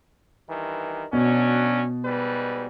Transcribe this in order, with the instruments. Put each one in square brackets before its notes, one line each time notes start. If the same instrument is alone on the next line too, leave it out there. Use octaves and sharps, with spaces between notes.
[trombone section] G2 D#3 E3
[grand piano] B2 [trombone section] F#3 C#4 D4
[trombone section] G#2 G3 B4